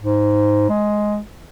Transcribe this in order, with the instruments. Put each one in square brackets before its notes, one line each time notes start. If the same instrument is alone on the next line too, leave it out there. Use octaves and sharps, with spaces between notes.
[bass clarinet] G#2
G#3